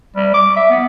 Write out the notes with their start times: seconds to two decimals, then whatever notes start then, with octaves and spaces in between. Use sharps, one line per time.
0.16 G3
0.34 D6
0.57 E5
0.70 B3